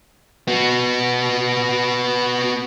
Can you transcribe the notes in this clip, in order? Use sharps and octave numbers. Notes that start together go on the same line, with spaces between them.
B3 F#4